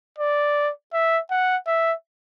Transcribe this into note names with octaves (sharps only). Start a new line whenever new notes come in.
D5
E5
F#5
E5